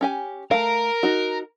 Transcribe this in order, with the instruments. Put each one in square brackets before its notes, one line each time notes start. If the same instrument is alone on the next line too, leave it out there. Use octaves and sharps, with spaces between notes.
[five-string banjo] C#4 G4 G#5
[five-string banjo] A3 F5 [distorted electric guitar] A#4
[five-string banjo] D#4 F#4